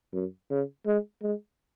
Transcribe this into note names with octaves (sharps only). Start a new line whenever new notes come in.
F#2
C#3
G#3
G#3